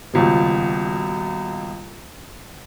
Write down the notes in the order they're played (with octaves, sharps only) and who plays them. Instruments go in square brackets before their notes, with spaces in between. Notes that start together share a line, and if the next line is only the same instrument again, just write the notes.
[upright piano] D#1 C#2 B2